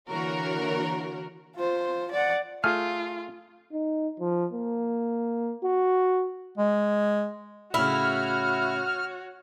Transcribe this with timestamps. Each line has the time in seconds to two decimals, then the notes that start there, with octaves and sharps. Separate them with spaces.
0.10 D3 E3 A#3 F#4 A#4 C#5
1.56 F4 C5
2.12 D5 F#5
2.64 A3 F4 G#4 F6
3.72 D#4
4.20 F3
4.52 A#3
5.64 F#4
6.58 G#3
7.74 A2 C#3 E4 F#4 C#5 F6